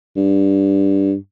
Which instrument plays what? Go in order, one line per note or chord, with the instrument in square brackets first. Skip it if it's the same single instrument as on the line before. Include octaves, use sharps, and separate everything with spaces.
[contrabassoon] G2